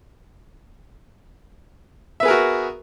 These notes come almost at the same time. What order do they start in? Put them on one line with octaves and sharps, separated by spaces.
E5 B3 G#4 A#4 F#4